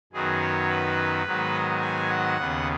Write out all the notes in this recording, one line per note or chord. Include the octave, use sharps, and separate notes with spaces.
F#2 D#3 F#3 B3 G#4
C#5
B4
G#2 D#3 F#3 B3
D#5
G#5
F#5
D#2 C#3 B3